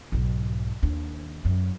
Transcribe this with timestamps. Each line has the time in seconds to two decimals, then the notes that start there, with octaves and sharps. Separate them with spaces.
0.12 B1 G#2
0.82 D#2 D4
1.45 F#2